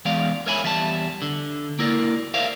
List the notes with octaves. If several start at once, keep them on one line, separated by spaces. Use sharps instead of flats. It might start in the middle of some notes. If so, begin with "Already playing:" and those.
E2 G#3 D5 F5
A#4 C#5 E5 G#5 B5
E2 G3 E5 F#5 A5
D3
A#3 E4 A#4 D5
A#4 C5 D5 E5 F5